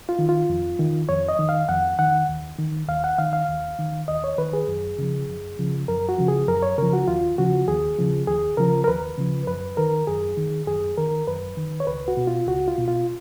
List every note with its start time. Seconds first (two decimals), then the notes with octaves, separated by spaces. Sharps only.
0.09 F4
0.19 D#3
0.29 F4
0.50 F2
0.79 D#3
1.09 F2 C#5
1.28 D#5
1.39 D#3
1.49 F5
1.69 F2 F#5
1.99 D#3 F#5
2.29 D#2
2.58 D#3
2.89 D#2 F5
3.04 F#5
3.18 D#3 F5
3.33 F5
3.49 D#2
3.79 D#3
4.08 D#2 D#5
4.24 C#5
4.38 D#3 B4
4.53 G#4
4.68 F#2
4.98 C#3 F3
5.28 F#2
5.59 C#3 F3
5.88 F#2 A#4
6.09 F#4
6.18 C#3 F3
6.28 G#4
6.48 F#2 A#4
6.63 C#5
6.78 C#3 F3 A#4
6.93 F#4
7.08 D#2 F4
7.38 C#3 F3 F#4
7.68 D#2 G#4
7.99 C#3 F3
8.27 D#2 G#4
8.57 C#3 F3 A#4
8.84 A#4
8.88 D#2 B4
9.18 C#3 F3
9.47 F#2 B4
9.77 D#3 A#4
10.07 F#2 G#4
10.37 D#3
10.67 F#2 G#4
10.97 D#3 A#4
11.28 F#2 B4
11.57 D#3
11.80 C#5
11.87 C#2 B4
12.08 F#4
12.17 B2
12.27 F4
12.48 C#2 F#4
12.68 F4
12.78 B2
12.88 F4